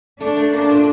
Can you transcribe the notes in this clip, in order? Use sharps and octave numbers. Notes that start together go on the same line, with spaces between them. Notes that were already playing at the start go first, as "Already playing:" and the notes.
A3 D4
A3
A#3 D4
A#2